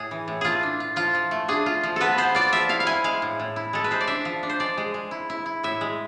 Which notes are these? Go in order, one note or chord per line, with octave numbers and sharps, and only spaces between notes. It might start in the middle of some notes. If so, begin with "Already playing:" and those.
Already playing: A2 G#4
E3
A2
A3 F4 G#4
D4
F4
F3 F4
F3
A3
D4 G#4
F4
F3
B3 A4 B4
B3 C5
F4 D5
F3 E5
E4 F5
F5
E4 G#5
G#3 F5
A2
A2
E4
G#3 A4
B4
G#3 C5
D5
D4 E5
F3
D4
C5
G#3 D5
G#3
G#3
E4
E4
E4
A2 E5
G#3